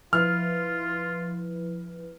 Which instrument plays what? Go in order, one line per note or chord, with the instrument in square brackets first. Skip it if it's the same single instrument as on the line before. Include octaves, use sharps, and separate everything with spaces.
[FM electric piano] F3 E4 B4 [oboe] F4 [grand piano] F6